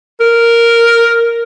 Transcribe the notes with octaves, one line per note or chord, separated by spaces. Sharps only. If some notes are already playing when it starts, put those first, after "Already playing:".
A#4